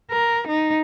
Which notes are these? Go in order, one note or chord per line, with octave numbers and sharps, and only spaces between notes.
A#4
D#4